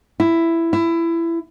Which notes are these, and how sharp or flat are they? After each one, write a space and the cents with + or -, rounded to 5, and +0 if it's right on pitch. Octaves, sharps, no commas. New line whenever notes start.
E4 +10
E4 +20